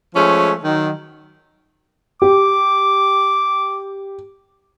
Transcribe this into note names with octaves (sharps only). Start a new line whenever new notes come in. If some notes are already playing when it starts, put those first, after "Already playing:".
F3 G#3 A3 C#4
D#3 F#3
G4 D6